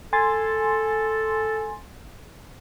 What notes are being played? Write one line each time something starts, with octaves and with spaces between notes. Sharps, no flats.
A4 G#5 C6 A6